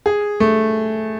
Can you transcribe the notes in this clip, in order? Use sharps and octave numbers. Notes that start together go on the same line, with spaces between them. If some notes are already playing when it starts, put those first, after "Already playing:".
G#4
A3